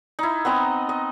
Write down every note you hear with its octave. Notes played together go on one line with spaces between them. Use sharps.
D#4 E4
B3 C4 D#5 A#5
D#5